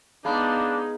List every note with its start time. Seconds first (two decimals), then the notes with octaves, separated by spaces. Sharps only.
0.25 G#3 B3 D4 D#4 F5 B5